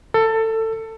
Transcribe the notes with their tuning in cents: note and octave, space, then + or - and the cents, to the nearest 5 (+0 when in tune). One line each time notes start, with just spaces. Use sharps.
A4 +20